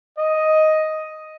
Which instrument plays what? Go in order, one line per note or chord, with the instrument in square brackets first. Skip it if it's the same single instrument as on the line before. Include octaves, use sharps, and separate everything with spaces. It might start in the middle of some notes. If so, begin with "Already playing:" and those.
[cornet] D#5